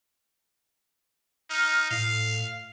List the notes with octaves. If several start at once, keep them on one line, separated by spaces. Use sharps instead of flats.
D#4 F6
A2 F5